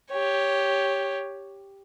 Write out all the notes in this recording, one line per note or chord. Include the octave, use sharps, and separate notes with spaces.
G4 C#5